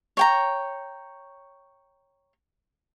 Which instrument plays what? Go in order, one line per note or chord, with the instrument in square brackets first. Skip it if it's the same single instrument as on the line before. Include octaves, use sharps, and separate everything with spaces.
[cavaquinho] C#5 G5 A#5